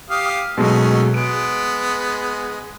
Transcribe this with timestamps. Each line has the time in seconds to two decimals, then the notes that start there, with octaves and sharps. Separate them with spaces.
0.10 G4 F5 D#6
0.57 B2 F#3 G#3 A3 C#4 D#4
1.14 G#3 B3 D7